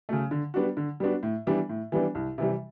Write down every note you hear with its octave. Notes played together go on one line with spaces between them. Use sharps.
C#3 F#3 A3
D3
G3 B3 D4 F#4
D3
G3 B3 D4 F#4
A2
E3 G3 B3 D4
A2
E3 G3 B3 D4
C2
C3 E3 G3